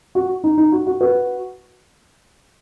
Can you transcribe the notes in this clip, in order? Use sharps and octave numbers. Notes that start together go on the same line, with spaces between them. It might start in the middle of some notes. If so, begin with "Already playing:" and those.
F#4
D#4
D#4
F#4
F#4
F#4 B4